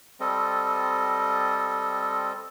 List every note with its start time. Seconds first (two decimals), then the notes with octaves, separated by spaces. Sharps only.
0.20 G3 C4 A4 D#5